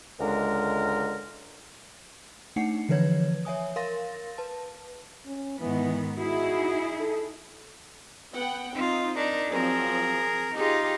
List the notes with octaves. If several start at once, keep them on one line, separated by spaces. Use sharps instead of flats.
C#2 D3 G#3 A#4
A3 D4 D#4 F#5 C7 C#7
D3 E3 F3 B4 C#5 G#6
C#5 E5 G#5 D#6
A#4 F5 C6 A6 A#6
B4 A5
C#4
G#2 D#3 E3 B3
D#4 E4 F#4 G#4
A4
B3 F#5 G5
C4 D#4 F4
D4 D#4 A#4
F3 F#3 C4 G#4 A#4
D#4 F4 G4 G#4